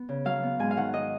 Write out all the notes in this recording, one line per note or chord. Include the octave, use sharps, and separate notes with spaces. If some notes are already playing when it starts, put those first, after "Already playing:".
Already playing: B3
C#3
F#3 F5
B3
G#2 G#5
F5
D#3 F#5
D#4 D#5